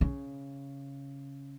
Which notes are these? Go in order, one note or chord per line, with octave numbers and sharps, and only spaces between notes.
C#3